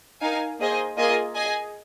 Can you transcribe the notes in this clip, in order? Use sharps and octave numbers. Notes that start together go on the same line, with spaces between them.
D#4 A#4 F5 G#5
A#3 G#4 C5 D#5 G#5
A#3 F4 G#4 D#5 G#5
G#4 D#5 G#5